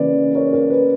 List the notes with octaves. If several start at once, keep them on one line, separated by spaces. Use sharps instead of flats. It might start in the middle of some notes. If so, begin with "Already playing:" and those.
Already playing: C#3 E3 A#3 C#4 B4 D5
A#4 C#5
A#4
B4